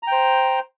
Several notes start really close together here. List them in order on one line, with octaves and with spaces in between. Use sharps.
A#5 G5 C5